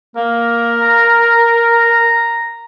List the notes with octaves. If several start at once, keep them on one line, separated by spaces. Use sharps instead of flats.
A#3 A#4
A#5